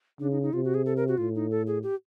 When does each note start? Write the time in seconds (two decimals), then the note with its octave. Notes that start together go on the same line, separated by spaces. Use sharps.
0.20 C#3 D4
0.31 D#4
0.42 D#4
0.53 C3 F4
0.64 F#4
0.74 G#4
0.86 A4
0.96 A#4
1.08 F#4
1.17 A2 F4
1.35 D#4
1.51 A4
1.67 G#4
1.83 G4